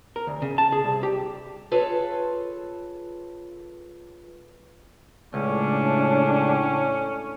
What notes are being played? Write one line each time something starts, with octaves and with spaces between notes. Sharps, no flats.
A#4
D2
C#3
A5
G#4
C2
G4
F4 G#4 A4 B4 C#5
C#2 A2 C#4 D4